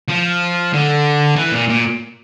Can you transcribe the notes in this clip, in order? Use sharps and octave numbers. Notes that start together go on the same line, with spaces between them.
F3
D3
E3
A#2
A#2